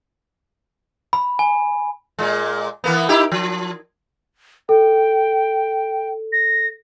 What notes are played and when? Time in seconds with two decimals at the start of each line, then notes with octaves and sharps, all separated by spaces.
1.13 B5
1.39 G#5
2.18 A#2 G#3
2.84 E3 A#3 B3
3.09 D#4 E4 G4
3.32 F3
4.69 A4 G5
6.33 A#6